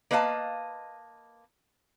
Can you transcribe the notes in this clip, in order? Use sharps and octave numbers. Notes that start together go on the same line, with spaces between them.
A#3 B4 D#5 F5 F#5 A5